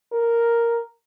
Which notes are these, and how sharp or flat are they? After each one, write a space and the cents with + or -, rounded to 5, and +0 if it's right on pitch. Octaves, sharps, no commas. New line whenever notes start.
A#4 +0